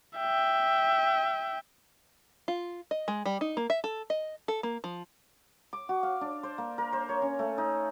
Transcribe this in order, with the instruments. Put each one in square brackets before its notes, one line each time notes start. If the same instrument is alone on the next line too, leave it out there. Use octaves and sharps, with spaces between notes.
[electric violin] E5 G5
[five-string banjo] F4
D#5
G#3
G3
D#4
A#3
E5
A4
D#5
A4
A#3
F3
[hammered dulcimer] D6
F#4
F5
D4
C5
A#3
A#4
C5
C#5
C#4
A3
D#4